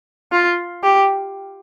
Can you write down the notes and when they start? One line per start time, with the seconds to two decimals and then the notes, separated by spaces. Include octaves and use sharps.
0.32 F4
0.83 G4